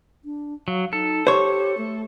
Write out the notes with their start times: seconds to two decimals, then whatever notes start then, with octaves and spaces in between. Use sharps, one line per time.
0.25 D4
0.68 F#3 F5
0.93 D#4 A4
1.27 G4 C5 C#5
1.78 A3